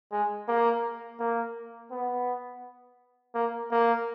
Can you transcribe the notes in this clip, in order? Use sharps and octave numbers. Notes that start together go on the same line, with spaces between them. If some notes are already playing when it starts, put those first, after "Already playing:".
G#3
A#3
A#3
B3
A#3
A#3